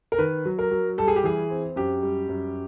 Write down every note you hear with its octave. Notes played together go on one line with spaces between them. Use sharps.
A#4
D#3 B4
F#3
A#4
F#3
G3 A4
G#4
G4
E3 G#4
C4
F#2 G4
G3
F#2